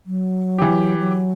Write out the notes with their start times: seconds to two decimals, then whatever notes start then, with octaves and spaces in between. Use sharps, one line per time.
0.06 F#3
0.58 E3 G4
0.99 F#3